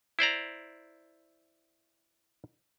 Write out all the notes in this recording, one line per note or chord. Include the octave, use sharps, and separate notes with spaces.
E4 C5 D5 A#5